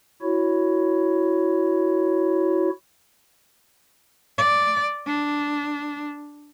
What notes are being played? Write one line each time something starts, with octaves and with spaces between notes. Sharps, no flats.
E4 F#4 C#5
D5
D4